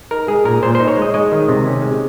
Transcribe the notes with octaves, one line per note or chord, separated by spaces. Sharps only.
D#4 A#4
G#3 G#4
A#2 A#4
A#2 C5
D#4 C5
C#5
G#3 D#5
G#3 D#5
D#3
C3
C#4
G#3